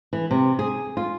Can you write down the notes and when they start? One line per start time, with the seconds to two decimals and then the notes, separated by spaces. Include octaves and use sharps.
0.13 E3
0.31 C3
0.59 G#4
0.97 F4